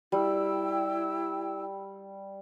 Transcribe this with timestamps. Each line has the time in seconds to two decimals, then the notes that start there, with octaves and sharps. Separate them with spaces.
0.12 G3 E4 G5 E6